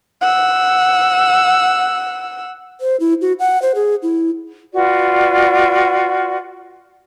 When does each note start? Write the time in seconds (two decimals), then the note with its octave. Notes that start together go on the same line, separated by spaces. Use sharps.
0.22 F#5 E6
2.81 C5
3.00 E4
3.21 F#4
3.39 F#5
3.62 C5
3.75 G#4
4.03 E4
4.74 F4 F#4 B4 D5